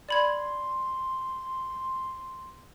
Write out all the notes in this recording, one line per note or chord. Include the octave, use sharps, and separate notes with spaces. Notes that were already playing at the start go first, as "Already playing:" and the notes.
D5 B5 C6 G#6